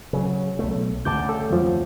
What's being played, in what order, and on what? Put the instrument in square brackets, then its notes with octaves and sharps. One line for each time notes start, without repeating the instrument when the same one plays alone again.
[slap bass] C#3 F#3
B1 A3
[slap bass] D2 G2 C#3 [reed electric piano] A5 D6 G6
[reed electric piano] A4
F2 F3